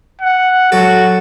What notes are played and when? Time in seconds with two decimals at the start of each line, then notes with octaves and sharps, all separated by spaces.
0.21 F#5
0.72 F#3 F#4 A4